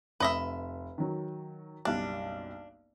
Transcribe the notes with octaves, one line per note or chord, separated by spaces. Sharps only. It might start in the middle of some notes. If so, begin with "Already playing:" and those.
F1 B4 D#5 E5
D#3 F#3
F#1 B1 G3 D4